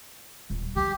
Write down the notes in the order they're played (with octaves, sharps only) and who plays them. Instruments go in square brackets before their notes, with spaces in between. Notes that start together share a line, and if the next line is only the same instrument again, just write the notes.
[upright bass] D#1 A#2
[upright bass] C#3 F#3 [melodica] G4